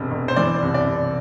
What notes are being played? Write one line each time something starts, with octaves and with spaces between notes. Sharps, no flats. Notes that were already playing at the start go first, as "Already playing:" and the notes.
Already playing: E1 C3
E1
C5
E3 D5
C2
D5
C2